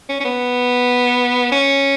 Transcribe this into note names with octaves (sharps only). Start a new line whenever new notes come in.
C#4
C#4
B3
C#4